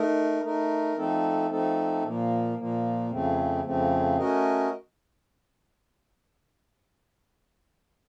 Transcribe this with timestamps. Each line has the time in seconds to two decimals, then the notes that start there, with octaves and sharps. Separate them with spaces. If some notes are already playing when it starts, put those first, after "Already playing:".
Already playing: A3 D#4 A#4
0.43 A3 D#4 A#4
0.97 F3 A3 C4 D#4 A4
1.50 F3 A3 C4 D#4 A4
2.03 A#2 F3 A#3
2.57 A#2 F3 A#3
3.11 F2 C#3 F3 A3 C4
3.64 F2 C#3 F3 A3 C4
4.18 A3 C#4 F#4 A#4 D#5